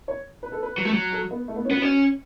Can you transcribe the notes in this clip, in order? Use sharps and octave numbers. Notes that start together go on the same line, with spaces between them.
C#5
B4
A4
B4
F#3
A3
F#3
A4
B3
A3
B3
C#4
B3 F#4
C#4